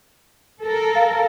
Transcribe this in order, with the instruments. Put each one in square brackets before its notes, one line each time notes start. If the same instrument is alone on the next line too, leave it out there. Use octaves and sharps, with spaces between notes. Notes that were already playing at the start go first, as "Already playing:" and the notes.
[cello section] A4 A#4
[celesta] F5